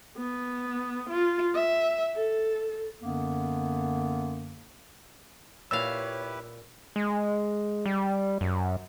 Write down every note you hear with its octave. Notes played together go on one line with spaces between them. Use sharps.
B3
F4
E5
A4
F#2 D3 A#3 B3
A#2 E4 G4 B4 C#5 F5 E6
G#3
G3
F#2